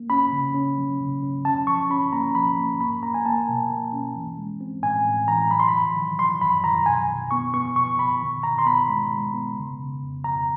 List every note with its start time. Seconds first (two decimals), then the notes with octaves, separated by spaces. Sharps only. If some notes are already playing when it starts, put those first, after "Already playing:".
Already playing: A#3
0.10 C#4 B5
0.33 C#3
0.54 C#4
0.78 F#3
1.00 C#3
1.23 C#4
1.45 C#4 A5
1.67 F3 C#6
1.90 C#4 B5
2.13 A#3 A#5
2.35 F3 B5
2.58 A#3
2.81 A#3 B5
3.03 A#3 A#5
3.14 G#5
3.26 A#3 A5
3.49 B2
3.70 A#3
3.93 C#4
4.16 E3
4.38 G#3
4.61 C4
4.83 A2 G#5
5.05 A2
5.28 E3 A#5
5.51 F#3 B5
5.60 C6
5.68 F#3 B5
5.97 D#3
6.19 F#3 C6
6.41 F#2 B5
6.64 D#3 A#5
6.86 B2 G#5
7.09 B2
7.31 B3 C#6
7.54 B3 C#6
7.76 B2 C#6
7.99 B2 B5
8.22 D#3
8.43 D#3 A#5
8.59 C6
8.66 B3 B5
8.89 G#3
9.11 G#3
9.34 B3
9.56 C#3
9.79 C#3
10.02 F2
10.24 F2 A#5